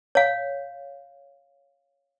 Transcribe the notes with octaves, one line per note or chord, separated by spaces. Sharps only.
C#5 F5